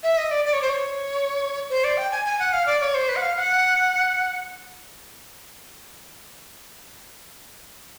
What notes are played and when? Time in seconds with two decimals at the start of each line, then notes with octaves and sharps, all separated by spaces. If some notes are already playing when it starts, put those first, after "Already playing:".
0.03 E5
0.17 D#5
0.31 D5
0.45 D5
0.53 C#5
0.62 C5
0.70 C#5
1.69 C5
1.84 D5
1.98 G5
2.11 G#5
2.25 G#5
2.39 F#5
2.53 F5
2.66 D5
2.81 C#5
2.94 C5
3.09 B4
3.16 F#5
3.22 F5
3.36 F#5